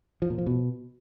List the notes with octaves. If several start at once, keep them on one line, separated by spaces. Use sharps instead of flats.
F3
A#2
F3
B2